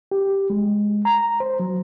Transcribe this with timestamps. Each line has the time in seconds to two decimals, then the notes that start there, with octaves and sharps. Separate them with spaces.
0.11 G4
0.50 G#3
1.05 A#5
1.40 C5
1.60 F#3